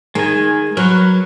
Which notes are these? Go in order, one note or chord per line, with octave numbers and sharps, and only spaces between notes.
D#3 G#3 G#5
F#3 A#4 B4 C#6